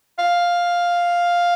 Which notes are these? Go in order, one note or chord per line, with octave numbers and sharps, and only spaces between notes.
F5